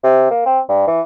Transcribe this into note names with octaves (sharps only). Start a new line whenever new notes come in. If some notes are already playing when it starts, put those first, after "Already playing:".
C3
A#3
C4
G2
E3